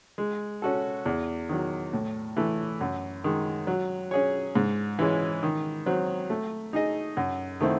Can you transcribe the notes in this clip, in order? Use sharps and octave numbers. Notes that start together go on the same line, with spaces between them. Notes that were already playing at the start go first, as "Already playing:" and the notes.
G#3
C#4 F#4 A4
E2
D#3 F#3
A2
E3 A3
F#2
D#3 G#3
F#3
C#4 G#4 C#5
G#2
E3 G#3 C#4
D#3
F#3 C4
A3
D#4 G#4 D#5
F#2
D#3 A3 C4 E4